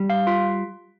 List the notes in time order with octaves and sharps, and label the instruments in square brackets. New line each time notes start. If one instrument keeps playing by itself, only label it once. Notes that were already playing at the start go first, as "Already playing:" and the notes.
Already playing: [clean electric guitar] G3
[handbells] F5
F4